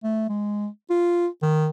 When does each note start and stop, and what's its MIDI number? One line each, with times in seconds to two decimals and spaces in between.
0.03 0.27 57
0.29 0.68 56
0.90 1.28 65
1.42 1.69 51